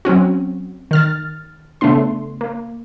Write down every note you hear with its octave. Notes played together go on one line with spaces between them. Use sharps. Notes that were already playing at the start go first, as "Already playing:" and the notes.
F#3 C4 C#4 F#4
D#3 F6 A6
C#3 A3 B3 D4 C6
A#3